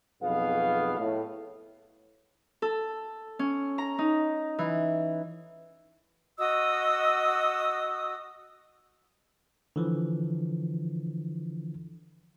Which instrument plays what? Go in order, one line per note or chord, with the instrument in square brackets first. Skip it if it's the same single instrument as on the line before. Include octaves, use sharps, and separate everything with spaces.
[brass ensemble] B1 F2 B2 B3 G#4 F5
A2
[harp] A4
C#4
A#5
D#4
E3
[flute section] F#4 D#5 D#6 E6
[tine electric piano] D3 E3 F3